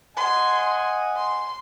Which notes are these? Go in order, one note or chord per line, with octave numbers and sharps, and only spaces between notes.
D#5 F#5 G#5 C6
C6